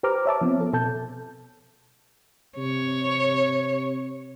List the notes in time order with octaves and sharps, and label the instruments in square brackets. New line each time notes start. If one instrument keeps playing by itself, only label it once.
[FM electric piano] G4 B4 C5 A#5 D6 F6
C#5 E5 A5 D6
F3 B3 C4
A4
B2 A4 A5 G6
[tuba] C3 [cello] C#5